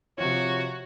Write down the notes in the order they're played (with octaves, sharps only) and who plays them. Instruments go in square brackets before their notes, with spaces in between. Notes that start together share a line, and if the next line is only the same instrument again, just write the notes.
[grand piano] C3 F3 F4 [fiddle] F#4 [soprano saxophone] C#5